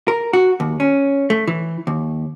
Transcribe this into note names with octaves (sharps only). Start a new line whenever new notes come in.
A#4
F#4
D#2
C#4
A3
E3
D#2